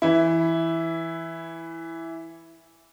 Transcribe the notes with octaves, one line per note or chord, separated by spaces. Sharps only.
E3 E4